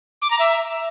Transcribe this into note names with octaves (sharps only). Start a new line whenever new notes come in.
D6
A#5
E5